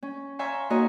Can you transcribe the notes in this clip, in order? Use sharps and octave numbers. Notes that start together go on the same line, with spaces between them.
C#4
C#5 E5 F5 G#5 A#5 C6
A#3 D#4 F#4 A#4 C#5 D#5